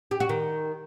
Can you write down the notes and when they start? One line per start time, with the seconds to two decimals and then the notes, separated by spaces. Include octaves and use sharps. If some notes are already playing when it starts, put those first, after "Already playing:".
0.11 G4
0.20 F#4
0.29 D#3